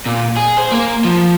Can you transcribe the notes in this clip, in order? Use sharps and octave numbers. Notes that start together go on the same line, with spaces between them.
A#2
G#4
C5
A#3
F3